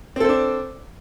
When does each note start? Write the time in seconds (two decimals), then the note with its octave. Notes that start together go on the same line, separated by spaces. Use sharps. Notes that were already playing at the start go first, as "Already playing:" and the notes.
0.16 C4
0.20 A4
0.25 C5
0.29 D4